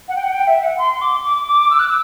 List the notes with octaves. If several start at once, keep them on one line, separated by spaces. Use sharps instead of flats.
F#5
G5
F#5
G5
E5
F#5
C6
D6
D6
D6
E6
F#6
E6